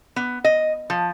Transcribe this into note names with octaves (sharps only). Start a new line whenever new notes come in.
B3
D#5
F3